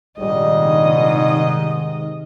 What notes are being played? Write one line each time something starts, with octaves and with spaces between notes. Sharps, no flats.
A#1 G#2 C3 D#3 G3 D#5